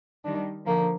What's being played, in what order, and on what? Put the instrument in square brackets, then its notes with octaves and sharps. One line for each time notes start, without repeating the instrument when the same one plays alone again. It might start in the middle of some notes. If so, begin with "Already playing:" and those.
[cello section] D#3 G3 [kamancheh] D4
[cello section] D3 F3 [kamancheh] A#3